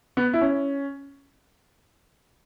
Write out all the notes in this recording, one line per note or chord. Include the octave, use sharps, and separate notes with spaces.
B3
E4
C#4